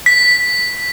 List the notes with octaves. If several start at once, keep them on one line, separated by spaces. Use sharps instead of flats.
B6